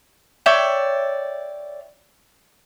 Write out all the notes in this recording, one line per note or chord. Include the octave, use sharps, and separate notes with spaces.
C#5 D5 E5 G5